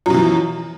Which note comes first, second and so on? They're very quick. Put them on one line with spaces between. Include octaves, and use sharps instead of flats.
F#2 B2 E3 F3